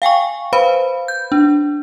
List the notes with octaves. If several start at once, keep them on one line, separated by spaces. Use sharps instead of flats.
F5 G5 G#5 C#6
B4 C5 F5 B5
G6
D4